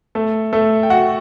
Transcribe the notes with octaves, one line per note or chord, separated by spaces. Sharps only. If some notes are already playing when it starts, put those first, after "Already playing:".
A3 A4
A3 A4
G5
F#4 F#5